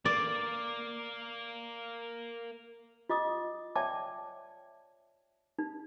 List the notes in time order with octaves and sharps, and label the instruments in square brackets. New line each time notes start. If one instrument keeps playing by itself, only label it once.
[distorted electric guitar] A#3 [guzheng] D5
[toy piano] F4 D#5 D6 D#6
C#5 D5 E5 G5 A5 D6
D#4